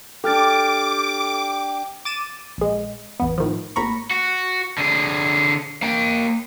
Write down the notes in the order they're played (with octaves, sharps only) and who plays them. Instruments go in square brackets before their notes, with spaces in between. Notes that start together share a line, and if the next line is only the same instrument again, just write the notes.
[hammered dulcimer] D4 G4 [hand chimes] A4 F6 A6 [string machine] D6
[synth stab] D6 A6 D#7 E7
A#1 G#3
A1 E2 B3
A2 D#3 F3
G#1 A2 A#3 A#5 B5 C#6
[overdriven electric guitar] F#4
D3 G#4
A#3 G5